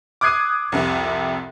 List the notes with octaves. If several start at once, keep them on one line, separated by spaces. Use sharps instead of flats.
D6 D#6 F#6 G#6 C7 D#7
C2 F2 C3